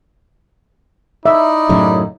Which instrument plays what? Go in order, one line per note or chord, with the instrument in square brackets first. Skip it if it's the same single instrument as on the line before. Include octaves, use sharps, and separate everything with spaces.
[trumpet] D#4 [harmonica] E4 D5 B5 [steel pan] E5
[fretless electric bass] F#2 A2 C#3